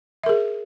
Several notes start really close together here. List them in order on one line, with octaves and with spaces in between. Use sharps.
E5 A#4 G#4